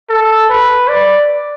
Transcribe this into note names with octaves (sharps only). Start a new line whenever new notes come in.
A4
B4
D5